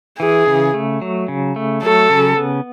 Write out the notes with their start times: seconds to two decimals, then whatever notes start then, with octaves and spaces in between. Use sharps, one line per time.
0.19 E3 G#4
0.47 C#3
0.74 A3
1.02 F#3
1.28 C#3
1.56 A3
1.83 F#3 A4
2.10 C#3
2.37 B3